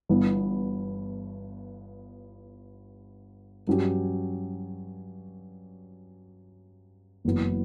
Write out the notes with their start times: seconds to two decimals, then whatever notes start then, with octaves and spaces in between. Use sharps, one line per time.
0.09 G1 G2 E3 B3
3.67 G2 F#3 C#4 G4
7.25 F#1 F#2 E3 B3